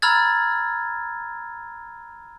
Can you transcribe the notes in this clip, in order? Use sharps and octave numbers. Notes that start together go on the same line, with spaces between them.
A#5 B5 E6 F6 G#6 A6